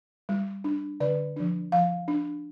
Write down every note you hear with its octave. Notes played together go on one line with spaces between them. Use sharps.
G3
D4
D3 D5
F3 D4
F3 F5
D4